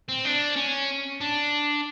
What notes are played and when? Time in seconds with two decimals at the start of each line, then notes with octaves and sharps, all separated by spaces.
0.09 C4
0.25 D4
0.56 C#4
1.21 D4